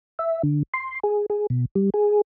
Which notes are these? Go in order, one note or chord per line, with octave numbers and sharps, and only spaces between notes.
E5
D3
C6
G#4
G#4
B2
G3
G#4